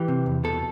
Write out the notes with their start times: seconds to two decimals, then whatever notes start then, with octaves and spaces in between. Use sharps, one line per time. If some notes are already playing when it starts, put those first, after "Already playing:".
Already playing: E3 G4
0.08 C3
0.26 E2
0.44 B2 A4